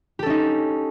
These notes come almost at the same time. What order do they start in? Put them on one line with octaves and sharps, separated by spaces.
G4 A4 C#4 D#4